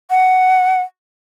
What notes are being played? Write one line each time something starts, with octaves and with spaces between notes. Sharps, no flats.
F#5